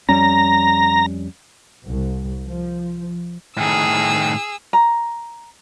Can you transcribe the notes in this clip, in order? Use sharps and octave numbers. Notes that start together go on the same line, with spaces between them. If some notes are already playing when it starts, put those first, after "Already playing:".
F2 G3 C#4 A#5
C2
F3
A2 D#3 G#4 E6
A#5